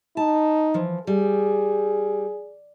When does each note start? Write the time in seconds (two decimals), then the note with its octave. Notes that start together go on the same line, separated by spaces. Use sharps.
0.17 D#4 A5
0.74 E3 F3
1.07 G3 G#4